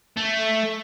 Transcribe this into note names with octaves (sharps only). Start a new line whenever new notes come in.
A3